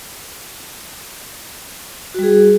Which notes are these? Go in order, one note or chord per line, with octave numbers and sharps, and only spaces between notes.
G3 F#4 G#4